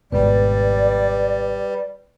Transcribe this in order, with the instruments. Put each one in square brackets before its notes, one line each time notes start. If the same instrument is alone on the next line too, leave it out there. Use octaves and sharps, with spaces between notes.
[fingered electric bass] G#1 G#2 B2 [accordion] G3 [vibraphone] B4 [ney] D5